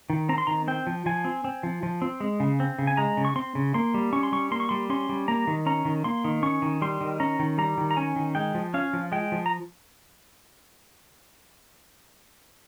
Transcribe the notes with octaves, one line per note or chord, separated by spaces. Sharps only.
D#3
C4 A#5
C6
D#3 A#5
C4 G5
F3
F3 G#5
C4
C4
F3
F3
C4
G#3
C#3
C4
C#3
G#5
G#3 A#5
C#3
C#6
C4 C6
C#3
A#3 C6
G3
C#4 C#6
C6
G3 C#6
A#3 C6
C#6
G3 C6
C#4 C6
G3
A#3 A#5
D#3
C#4 A#5
D#3
A#3 C6
D#3
C#4 C#6
D#3
G3 C6
D#3
C#4 A#5
D#3
G3 A#5
D#3
A#5
C#4 G#5
D#3
G#3 G5
F3
C#4 F5
F3
G#3 G5
F3
A#5